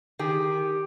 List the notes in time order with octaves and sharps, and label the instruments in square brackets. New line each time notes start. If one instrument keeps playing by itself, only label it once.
[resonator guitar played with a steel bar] D#3 G#4 [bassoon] G4